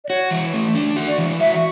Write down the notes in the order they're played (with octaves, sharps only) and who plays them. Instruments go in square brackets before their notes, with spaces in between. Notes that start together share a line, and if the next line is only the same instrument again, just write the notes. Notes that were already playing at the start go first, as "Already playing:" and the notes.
[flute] D5
[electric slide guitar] F#4 [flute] C#5
[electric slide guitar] E3
A3
D4
F#4
[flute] D5
[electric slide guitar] E3
[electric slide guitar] F#4 [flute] E5